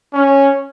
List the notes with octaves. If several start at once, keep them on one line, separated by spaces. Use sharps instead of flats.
C#4